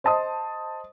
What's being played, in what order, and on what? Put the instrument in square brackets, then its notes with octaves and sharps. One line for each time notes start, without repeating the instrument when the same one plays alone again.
[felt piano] C5 D#5 A5 C6 D#6